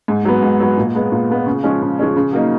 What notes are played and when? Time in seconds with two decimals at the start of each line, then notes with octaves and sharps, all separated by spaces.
0.08 G#2
0.25 F#3 B3
0.42 G#2
0.60 F#3 B3
0.77 A#2
0.95 G#3 B3
1.12 A#2
1.30 G#3 B3
1.46 C#3
1.64 F3 G#3 C#4
1.82 C#3
1.99 F3 G#3 C#4
2.16 C#3
2.33 F#3 A#3 D#4